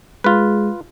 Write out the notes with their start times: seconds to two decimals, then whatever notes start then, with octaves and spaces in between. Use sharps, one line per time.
0.24 G#3 F4 B4